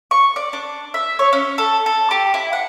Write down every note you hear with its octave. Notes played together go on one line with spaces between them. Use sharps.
C#6
D5
D4
E5
C#5
C#4
A4
A4
G4
E4
F#5